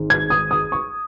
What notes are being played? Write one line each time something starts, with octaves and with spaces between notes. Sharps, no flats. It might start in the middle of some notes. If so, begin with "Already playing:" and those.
Already playing: G#1 G#2
G#6
D#6
D#6
C#6